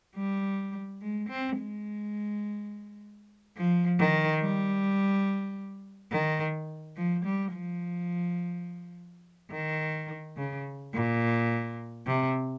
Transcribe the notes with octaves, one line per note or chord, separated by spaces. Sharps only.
G3
G#3
C4
G#3
F3
D#3
G3
D#3
F3
G3
F3
D#3
C#3
A#2
C3